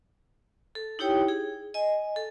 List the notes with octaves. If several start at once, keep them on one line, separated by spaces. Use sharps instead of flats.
A4
D#4 E4 G4 C#5 G5 D#6
G#4
D#5 G#5
A4